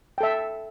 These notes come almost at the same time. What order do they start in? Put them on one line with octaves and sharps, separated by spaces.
G5 A4 E5